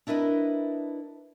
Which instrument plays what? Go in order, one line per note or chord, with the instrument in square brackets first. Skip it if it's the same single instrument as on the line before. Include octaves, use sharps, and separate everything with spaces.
[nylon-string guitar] D4 E4 A#4 B4 D#5